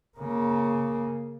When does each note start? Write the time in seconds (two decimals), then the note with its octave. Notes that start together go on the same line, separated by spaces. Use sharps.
0.18 C#3 A#3